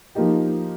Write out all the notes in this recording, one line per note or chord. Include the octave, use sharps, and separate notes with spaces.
F3 A#3 D#4 G4